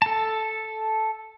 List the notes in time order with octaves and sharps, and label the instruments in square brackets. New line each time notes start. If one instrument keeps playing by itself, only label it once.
[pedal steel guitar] A4 A5